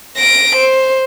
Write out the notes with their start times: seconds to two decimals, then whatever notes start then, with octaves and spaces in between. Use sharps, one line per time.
0.18 A#6 D7
0.56 C5